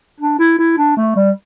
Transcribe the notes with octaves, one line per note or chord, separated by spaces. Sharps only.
D4
E4
E4
D4
A3
G3